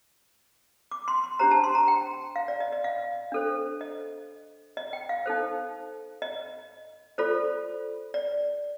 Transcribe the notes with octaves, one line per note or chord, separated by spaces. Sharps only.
D6
C6
C6
D4 G4 C5 A#5
A5
C6
A#5
G5
F5
D5
D#5
D#5
F5
D4 A4 C5
D#5
D#5
G5
F5
D#4 A4 C5
D#5
F4 A4 C5 D5
D5